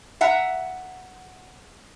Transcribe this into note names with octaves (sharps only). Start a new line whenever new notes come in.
E5 F#5 A#5